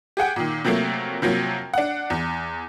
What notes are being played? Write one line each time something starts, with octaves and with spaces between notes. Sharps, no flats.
G4 G#4 F#5 G5
A#2 D#3
C3 F3 F#3 A3 A#3
C3 F3 F#3 A#3
D4 F#5
E2